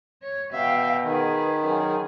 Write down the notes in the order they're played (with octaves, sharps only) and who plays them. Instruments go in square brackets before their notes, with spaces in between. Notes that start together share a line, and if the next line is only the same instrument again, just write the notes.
[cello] C#5
[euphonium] B2 [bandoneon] E5 [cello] F5 G5
[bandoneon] D#3 [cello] G#4 B4
[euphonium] F#2 [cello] G#4